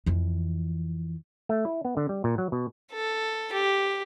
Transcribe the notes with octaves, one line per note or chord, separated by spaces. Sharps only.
F2 E3
A3
E4
B3
D3
G3
A#2
F#3
B2
A4
G4